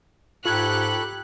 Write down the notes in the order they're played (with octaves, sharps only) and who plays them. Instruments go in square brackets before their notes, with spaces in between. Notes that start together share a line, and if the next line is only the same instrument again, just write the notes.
[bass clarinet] G#2 [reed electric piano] F4 G#6 [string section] G4 F#6 [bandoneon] A4 B5 C#6